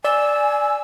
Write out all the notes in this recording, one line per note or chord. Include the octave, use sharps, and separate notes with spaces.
D5 G#5 E6